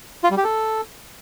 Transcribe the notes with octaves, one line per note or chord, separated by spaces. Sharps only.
F4
G3
G4
A4